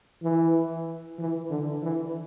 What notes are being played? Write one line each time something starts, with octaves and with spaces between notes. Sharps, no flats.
E3
E3
D3
E3